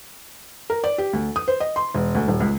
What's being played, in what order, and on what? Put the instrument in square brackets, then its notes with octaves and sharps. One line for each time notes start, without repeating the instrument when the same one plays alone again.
[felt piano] A#4
D5
G4
D2
D#6
C5
D#5
C6
E1
D2
D#1
C#2